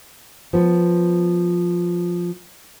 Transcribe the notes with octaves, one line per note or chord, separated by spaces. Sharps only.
F3 B3